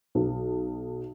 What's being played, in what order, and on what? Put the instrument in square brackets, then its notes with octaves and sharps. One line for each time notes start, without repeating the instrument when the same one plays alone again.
[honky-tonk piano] B1